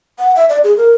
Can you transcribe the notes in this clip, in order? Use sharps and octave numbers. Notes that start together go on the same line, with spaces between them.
F#5
E5
D5
G#4
A#4